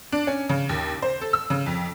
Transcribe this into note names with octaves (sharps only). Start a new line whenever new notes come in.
D4
C#4
C#3
D#2
C5
A4
E6
C#3
F2